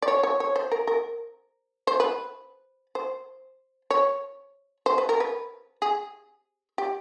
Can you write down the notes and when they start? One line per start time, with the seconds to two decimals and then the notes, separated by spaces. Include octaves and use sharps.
0.02 D5
0.08 C#5
0.23 C#5
0.40 C#5
0.56 C5
0.72 A#4
0.87 A#4
1.87 C5
2.00 B4
2.95 C5
3.91 C#5
4.86 C5
4.98 B4
5.09 A#4
5.20 B4
5.82 G#4
6.78 G4